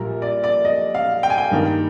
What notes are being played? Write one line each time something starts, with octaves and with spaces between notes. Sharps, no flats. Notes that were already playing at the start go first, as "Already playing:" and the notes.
Already playing: A#1 A#2 G3 A#3 A#4
D5
D5
D#5
F5
G5
G#5
G5
G2 D#3 A#3